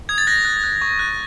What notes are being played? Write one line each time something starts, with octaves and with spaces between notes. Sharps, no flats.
D#6 G#6
A6
F#6 A#6
F#6
F#6
C#6
F#6